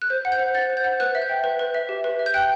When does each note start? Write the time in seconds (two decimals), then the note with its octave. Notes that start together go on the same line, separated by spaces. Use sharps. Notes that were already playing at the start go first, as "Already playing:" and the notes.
0.02 F#6
0.10 C5 G6
0.25 F#5
0.32 G6
0.40 C5
0.55 F#5 A6
0.70 C5
0.77 G6
0.84 F#5
1.00 B4 F#6
1.15 E5
1.22 G6
1.29 G5
1.44 B4
1.59 B4
1.74 E5
1.89 G4
2.04 B4
2.19 E5
2.26 G6
2.34 G5 F#6